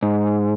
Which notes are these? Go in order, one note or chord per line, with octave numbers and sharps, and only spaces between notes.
G#2